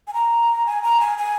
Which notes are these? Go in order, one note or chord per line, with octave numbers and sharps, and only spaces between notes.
G#5
A#5
G#5
A#5
G#5
G#5